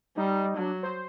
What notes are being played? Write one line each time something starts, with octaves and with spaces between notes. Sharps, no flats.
G3 D#4
F#3 D4
C5